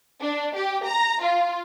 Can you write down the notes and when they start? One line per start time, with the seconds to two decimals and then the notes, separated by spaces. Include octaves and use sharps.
0.21 D4
0.55 G4
0.85 A#5
1.21 F4